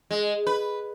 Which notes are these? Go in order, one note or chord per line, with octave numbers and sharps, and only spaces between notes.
G#3
B4